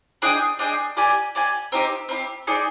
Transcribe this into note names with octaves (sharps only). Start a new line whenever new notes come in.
D4 G#4 D#5 G5
D4 G#4 D#5 G5
G4 D5 G#5
G4 D5 G#5
C4 D#4 G4
C4 D#4
G4
D#4 G#4 D5